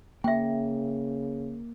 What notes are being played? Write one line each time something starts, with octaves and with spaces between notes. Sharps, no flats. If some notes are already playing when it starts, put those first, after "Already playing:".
C#3 A#3 E5 G5